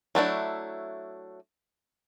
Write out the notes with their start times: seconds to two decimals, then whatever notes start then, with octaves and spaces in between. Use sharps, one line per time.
0.15 F#3 A3 D4 E4